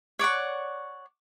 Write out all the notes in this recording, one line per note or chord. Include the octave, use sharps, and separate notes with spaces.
C#5 D5 F#5 C#6